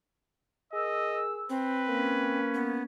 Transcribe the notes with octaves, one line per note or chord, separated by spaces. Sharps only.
G#4 A#4 D#5 E6
C4 B4
A#3 C#4
B3